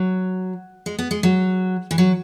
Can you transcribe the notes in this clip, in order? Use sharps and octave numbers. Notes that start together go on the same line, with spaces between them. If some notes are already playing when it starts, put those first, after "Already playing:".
Already playing: F#3
G#3
B3
G#3
F#3
E3
F#3